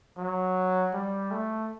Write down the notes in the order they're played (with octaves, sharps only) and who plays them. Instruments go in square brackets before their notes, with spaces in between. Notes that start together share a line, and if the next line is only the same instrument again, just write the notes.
[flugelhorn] F#3
G3
A3